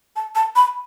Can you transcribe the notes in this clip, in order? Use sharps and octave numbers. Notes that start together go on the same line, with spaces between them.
A5
A5
B5